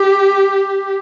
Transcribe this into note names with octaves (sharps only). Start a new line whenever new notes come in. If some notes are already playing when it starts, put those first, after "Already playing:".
Already playing: G4